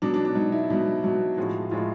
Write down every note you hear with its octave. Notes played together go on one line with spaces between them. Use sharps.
B2 F#3 D4
D4
D4
B2 F#3 D#4
E4
B2 F#3
B2 F#3
A2 F3 G#3 F#4
A2 F3 G#3 F4